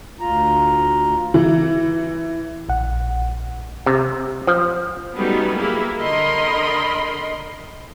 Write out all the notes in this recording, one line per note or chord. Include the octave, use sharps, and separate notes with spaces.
D2 F4 A#5
E3
A#1 F#5
C3
F3
F#3 G3 A3 B3 C#4 D#4
A#3 E4 G4 G#4
D3 A#4 D#5 B5 C6